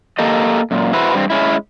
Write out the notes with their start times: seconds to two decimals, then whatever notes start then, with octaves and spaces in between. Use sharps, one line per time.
0.18 A#3 G4 A4 D#5
0.71 F#2 A#2
0.93 E4 F#4 G#4 B4 C5
1.15 G2 C4
1.30 G#3 C#4 E4